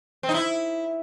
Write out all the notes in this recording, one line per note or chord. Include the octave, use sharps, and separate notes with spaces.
C4
D#4
E4